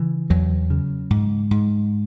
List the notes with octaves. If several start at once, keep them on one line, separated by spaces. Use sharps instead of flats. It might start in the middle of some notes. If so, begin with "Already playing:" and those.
Already playing: C#3 E3
E2 F#3
C#3
G#2
G#2